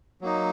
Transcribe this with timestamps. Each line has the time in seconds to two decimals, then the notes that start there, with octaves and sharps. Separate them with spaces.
0.21 F#3 A#3 D#4